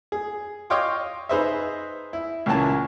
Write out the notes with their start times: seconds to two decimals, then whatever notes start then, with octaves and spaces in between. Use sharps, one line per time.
0.12 G#4
0.70 C#5 D#5 F5 G5 C6 D6
1.29 D#4 G#4 B4 C5 D#5 E5
2.13 E4
2.46 C#2 A#2 E3 C#4 A5